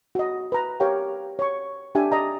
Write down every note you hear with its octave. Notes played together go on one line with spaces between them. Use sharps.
F#4 D#5
B4 A#5
G4 A#4 C#5 F5 G5
C#5 C#6
D4 G4 E5 G#5
D5 D#5 A#5